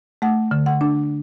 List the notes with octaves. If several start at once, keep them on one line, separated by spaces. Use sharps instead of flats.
A3 F#5
D3
F#5
D4